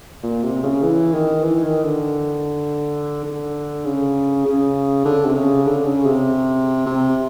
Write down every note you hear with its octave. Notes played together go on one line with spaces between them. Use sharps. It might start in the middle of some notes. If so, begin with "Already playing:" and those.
A#2
C3
C#3
E3
D#3
E3
D#3
D3
D3
C#3
C#3
D3
C3
C#3
D3
C#3
C3
C3